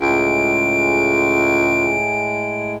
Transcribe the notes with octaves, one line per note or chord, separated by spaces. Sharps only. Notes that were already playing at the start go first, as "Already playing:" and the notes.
C#2 A2 G#3 D7